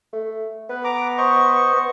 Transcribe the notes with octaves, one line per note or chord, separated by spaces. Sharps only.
A3
B3 B4
A#5 D6
C5 D#5 C#6
B3